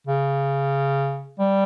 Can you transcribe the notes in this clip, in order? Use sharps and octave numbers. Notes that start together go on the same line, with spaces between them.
C#3
G3